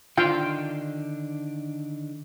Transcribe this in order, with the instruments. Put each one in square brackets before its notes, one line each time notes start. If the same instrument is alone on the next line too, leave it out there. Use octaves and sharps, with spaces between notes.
[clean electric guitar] D3 D#3 D4 [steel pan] F4 F5 G5